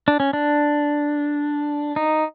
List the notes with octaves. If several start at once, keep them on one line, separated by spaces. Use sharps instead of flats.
D4
C#4
D4
D#4